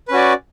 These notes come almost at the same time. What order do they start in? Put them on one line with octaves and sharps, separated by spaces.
B4 C#4 F#4 D5